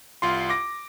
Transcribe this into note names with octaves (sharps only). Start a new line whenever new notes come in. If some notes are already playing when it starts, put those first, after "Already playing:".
C2 F4 C6
D6 A#6